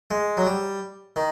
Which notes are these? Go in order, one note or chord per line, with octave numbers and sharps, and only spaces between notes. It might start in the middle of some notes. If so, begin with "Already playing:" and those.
G#3
F#3
G3
D#3